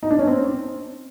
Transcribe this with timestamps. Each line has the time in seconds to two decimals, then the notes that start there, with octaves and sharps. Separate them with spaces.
0.03 D#4
0.11 D4
0.19 C#4
0.27 C4